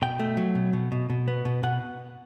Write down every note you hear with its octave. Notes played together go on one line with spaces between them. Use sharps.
B2 G5
A3
F#3
B2
B2
B2
B2
B3
B2
B2 F#5